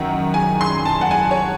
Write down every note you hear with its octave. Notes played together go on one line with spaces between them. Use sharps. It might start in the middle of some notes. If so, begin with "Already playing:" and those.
Already playing: F#2 D#3 F#5
G#5
C6
A5
F#5
G#5
C#5